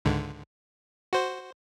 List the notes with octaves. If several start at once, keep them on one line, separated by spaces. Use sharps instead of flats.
C#2 G#2 D3
F#4 C5